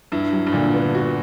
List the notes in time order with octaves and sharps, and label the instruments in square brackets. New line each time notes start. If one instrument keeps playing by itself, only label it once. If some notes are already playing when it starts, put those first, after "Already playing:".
[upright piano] G2 [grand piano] E4
[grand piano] F#3
[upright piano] G2
[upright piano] A#2 [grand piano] D3
[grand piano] B3
F#4